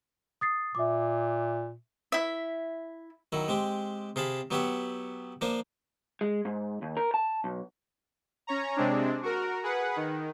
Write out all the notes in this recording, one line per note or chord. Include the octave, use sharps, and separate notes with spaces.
D#6 A6 C7
A#2 E5 D6
E4 E5
D#3 F#3 E4
G#3 C4 G4
C3 G#4 F5 A5 B5
F#3 B3 G4 C#5 E5
F3 A#3 D4 C5
G#3
G#2
D#2
A#4
A5
B1
C#4 C#5 A#5
C3 G#3 C4 D4
F#4 A#4
G#4 B4 F#5
D#3